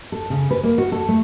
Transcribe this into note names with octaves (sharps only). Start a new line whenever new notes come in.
A4
C#3
B4
A#3
F#4
A4
A3